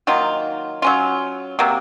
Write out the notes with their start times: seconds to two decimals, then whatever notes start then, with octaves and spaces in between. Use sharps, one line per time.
0.07 D#3 F#3 A#3 F4
0.82 F#3 C#4 F4
1.59 C3 F#3 A#3